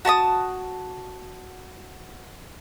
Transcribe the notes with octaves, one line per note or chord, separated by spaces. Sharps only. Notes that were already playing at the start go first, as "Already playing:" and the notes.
F#4 A5 A#5 D#6